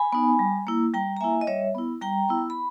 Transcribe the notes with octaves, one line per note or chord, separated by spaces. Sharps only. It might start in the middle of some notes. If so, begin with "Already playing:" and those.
Already playing: G#5 B5
B3 D#4
G3
A#3 E4
G3 G5 A#5
A#5
A#3 E4 E5 G#5
D#5
G3 C#5 E5
B3 E4
G3 G5 A#5
B3 E4
B5